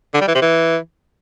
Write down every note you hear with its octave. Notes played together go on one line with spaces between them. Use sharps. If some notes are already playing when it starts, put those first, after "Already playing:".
D3
G3
E3
C3
E3